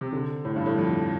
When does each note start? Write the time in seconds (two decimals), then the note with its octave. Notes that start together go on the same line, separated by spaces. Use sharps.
0.01 C3
0.12 D3
0.45 A2
0.56 G2
0.66 A2
0.78 F2